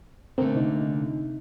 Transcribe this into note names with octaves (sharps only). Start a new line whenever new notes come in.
A#2 D3 A3 C4 A#4
C3 D#4